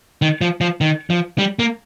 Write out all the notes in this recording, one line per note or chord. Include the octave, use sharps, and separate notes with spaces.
D#3
F3
F3
D#3
F3
G3
A#3